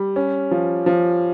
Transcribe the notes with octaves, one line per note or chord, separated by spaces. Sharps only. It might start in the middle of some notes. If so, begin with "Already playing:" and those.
Already playing: G3
C#4
F3
F3